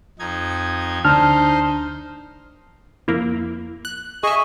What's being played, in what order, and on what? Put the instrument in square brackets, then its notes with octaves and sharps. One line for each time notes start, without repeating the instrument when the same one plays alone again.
[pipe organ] F2 D#4 G#6
[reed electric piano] D2 F6 [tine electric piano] D4 A5 [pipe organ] D#4 C5
[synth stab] F2 A#3 E4
F#6
[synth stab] G#4 E5 [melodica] D#5 G#5 C#6